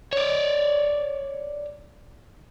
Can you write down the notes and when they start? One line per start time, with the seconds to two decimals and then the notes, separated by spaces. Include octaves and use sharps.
0.13 C#5 D5